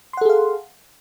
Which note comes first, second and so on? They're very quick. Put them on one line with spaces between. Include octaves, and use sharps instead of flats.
C6 F#5 A4 G#4 F5